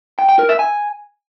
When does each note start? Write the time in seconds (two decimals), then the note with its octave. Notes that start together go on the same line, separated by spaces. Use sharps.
0.19 G5
0.29 G5
0.39 A#4
0.49 E5
0.59 G#5